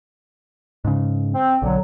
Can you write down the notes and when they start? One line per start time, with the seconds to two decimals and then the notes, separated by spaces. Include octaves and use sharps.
0.85 G#2 C#3
1.33 C4
1.62 B1 D3 F#3